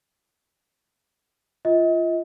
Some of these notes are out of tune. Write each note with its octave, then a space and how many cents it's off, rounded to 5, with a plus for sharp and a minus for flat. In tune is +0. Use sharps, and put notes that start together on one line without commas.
F4 -20 D#5 +35